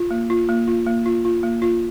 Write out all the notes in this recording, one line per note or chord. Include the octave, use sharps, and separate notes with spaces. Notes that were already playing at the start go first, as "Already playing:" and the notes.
Already playing: F4
A#3
F4
A#3
F4
A#3
F4
F4
A#3
F4